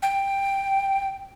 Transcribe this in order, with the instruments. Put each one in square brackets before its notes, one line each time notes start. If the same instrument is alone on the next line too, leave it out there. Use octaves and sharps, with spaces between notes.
[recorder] G5